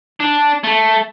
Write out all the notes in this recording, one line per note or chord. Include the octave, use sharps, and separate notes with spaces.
D4
A3